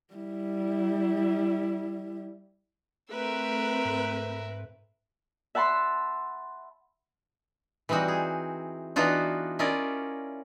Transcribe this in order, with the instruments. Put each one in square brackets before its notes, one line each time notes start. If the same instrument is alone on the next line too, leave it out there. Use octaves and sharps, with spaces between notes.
[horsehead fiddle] G3 E4
[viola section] A3 C4 B4 [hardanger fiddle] A#4 E5
[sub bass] G#2
[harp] E5 F#5 A5 B5 C6
[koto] E3 G3 C4 D#4 F#4
G#4
E3 B3 D4 D#4 F4 F#4
C#4 E4 F4 A#4 D5 D#5